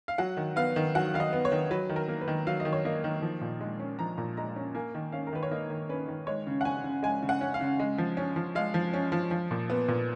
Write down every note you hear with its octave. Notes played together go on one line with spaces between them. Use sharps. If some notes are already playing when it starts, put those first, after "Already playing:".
F5
F#3 F#5
D#3
B3 F5
D#3
F#3 F#5
D#3 F5
D#5
B3
C#5
D#3
F#3 B4
D#3
A#4
A#3
B4
D#3
F#3 F5
D#5
D#3
C#5
A#3 D#5
D#3
F3
A#2
G#3
C#4
F3 A#5
A#2
G#3 A#5
C#4
A#3 G#5
D#3
C#4 F5
A#4
D#3 B4
C#5
A#3 D#5
D#3
C#4 B4
D#3
G#3 C#5
C#3
F#5
C#4 G#5
C#3
G#3 G#5
C#3
F#5
C#4
F5
C#3
G#3
F3
C#4
F3
G#3 F5
F3
C#4
F3
F3
A#2
B3
A#2